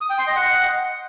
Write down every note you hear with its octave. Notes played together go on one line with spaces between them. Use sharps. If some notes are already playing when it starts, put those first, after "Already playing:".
D#6
G5
C6
D#5
F#5